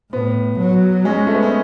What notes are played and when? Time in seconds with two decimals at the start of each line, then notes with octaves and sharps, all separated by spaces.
0.13 A2 B3
0.59 F#3
1.05 G#3 C#4
1.27 A3
1.34 B3
1.43 C#4